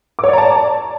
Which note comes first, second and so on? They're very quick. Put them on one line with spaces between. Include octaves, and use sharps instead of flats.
D6 C#5 D5 A#5 A5